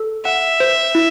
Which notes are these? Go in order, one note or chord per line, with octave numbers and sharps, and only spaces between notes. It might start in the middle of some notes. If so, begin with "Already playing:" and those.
Already playing: A4
E5 F#5
C5
E4